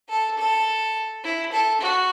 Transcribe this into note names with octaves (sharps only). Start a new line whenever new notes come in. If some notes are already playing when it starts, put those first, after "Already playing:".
A4
A4
E4
A4
F#4